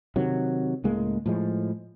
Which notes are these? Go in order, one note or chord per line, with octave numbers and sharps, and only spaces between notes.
C3 D#3 F#3
C#2 A2 G#3 A#3
A2 F3 G#3